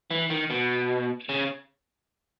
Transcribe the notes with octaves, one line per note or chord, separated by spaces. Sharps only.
E3
D#3
B2
C#3